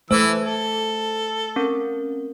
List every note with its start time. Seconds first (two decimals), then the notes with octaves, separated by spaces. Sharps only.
0.11 E3 A3 C5 E6
0.43 A4
1.56 C4 C#4 A#4